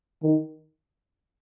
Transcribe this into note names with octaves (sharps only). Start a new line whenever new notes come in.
D#3